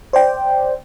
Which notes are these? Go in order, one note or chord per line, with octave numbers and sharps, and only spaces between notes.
C5 D5 G5